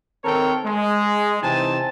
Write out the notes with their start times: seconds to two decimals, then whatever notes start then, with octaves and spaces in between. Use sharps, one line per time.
0.24 D#3 C4 A4 A#4 C#5 G5
0.64 G#3
1.42 C3 E3 C4 D#4 G#5 A5